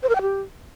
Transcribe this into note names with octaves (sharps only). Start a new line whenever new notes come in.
C5
A#4
G5
G4